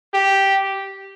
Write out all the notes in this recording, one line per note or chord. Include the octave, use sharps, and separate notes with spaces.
G4